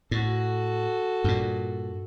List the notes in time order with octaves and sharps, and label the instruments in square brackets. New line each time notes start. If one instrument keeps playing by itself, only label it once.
[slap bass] A2 [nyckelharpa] F#4 A4
[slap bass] G2 A#2